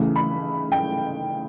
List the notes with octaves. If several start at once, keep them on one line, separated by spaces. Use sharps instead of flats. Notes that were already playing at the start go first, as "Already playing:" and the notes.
Already playing: C#3 E3 A3
B5
G5